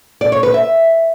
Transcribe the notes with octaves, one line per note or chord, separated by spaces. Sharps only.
D5
C#5
B4
E5